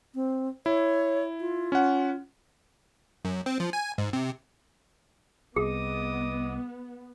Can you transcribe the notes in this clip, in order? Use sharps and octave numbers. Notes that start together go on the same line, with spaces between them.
C4
E4 C#5
F4
C#4 F#5
F#2
C4
F3
G#5
G#2
C3
C2 B3 G#4 D#5 D6 D#6